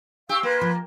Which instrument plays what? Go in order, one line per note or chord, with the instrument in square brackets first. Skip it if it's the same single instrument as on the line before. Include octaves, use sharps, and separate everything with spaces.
[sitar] G4 [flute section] F5 C#6 E6
[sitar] A#3 [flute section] B4 C6
[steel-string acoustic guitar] F3